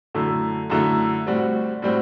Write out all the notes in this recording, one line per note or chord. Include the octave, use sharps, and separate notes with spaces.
F#2 D3 A3 E4
F#2 D3 A3 E4
A2 G3 C4 F#4
A2 G3 C4 F#4